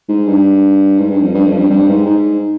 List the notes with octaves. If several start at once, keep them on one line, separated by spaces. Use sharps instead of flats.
G#2
G2
G#2
G2
F2
G2
F2
G2
G2
G#2
G#2